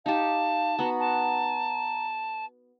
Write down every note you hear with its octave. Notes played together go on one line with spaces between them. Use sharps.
D#4 G4 F5 A5
B3 F#4 A#5
A5